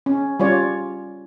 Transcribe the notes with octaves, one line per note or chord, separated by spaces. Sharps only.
C#4
G3 C#4 F4 C#5 D5